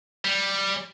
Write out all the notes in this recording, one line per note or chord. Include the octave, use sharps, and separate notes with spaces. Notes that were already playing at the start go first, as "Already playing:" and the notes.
G3